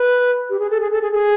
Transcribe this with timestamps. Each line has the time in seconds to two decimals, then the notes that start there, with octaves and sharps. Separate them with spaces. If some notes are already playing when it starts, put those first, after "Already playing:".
Already playing: B4
0.50 G4
0.60 G#4
0.70 A4
0.80 G#4
0.92 A4
1.02 G#4
1.12 G#4